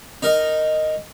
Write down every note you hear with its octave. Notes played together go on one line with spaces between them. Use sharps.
D#4 A#4 D#5